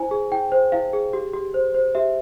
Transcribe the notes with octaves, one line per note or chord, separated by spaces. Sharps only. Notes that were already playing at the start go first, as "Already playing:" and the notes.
Already playing: E4 C5 G#5
G#4
E4 G5
C5
E4 F5
G#4
G4
G4
C5
C5
G4 E5